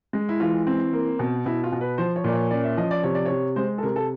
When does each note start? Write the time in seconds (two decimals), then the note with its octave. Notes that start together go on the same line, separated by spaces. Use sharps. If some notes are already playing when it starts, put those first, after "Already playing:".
0.13 G#3
0.29 E4
0.40 E3 F4
0.67 C4
0.93 A#3
1.19 B2
1.46 B2 E4
1.64 F4
1.72 B2
1.81 B4
1.98 F3 C5
2.16 C#5
2.24 A#2 D5
2.33 C#5
2.51 C#4 D5
2.64 E5
2.77 F3 D#5
2.91 D5
3.03 C3 C#5
3.15 D5
3.26 C3 C#5
3.56 G#3 C5
3.78 A4
3.83 C3 A#4
3.96 A4